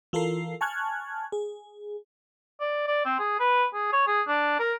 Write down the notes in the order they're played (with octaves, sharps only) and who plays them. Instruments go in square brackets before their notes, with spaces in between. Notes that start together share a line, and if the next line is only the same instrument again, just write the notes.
[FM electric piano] E3 F4 A4 A#4 C7
G#5 A5 C#6 F6 F#6 G#6
G#4
[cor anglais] D5
D5
C4
G#4
B4
G#4
C#5
G#4
D4
A#4